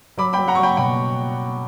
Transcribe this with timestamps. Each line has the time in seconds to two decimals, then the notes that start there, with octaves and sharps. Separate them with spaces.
0.18 F#3 B5 D6
0.33 G5 B5
0.38 F#3
0.48 F#5 A#5
0.55 C#6
0.58 F#3
0.63 G5 B5
0.77 B2 G5 B5